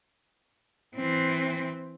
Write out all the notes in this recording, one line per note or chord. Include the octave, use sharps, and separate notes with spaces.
E3 C4